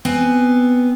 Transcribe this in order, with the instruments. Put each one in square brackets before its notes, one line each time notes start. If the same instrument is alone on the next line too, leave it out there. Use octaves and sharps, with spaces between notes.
[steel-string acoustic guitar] B3 C4 G#5